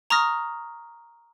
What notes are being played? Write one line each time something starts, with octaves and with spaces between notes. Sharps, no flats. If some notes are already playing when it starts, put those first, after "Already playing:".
A#5 C#6 D#6 F6 A#6